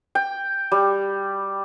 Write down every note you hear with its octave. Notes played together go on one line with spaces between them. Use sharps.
G5
G3